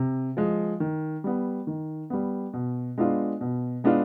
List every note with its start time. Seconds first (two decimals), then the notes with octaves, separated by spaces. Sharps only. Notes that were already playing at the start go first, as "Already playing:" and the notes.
Already playing: C3
0.37 F3 G#3
0.80 D#3
1.24 G3 B3
1.67 D#3
2.10 G3 B3
2.53 B2
2.98 G#3 B3 D4 F4
3.41 B2
3.84 G#3 B3 D4 F4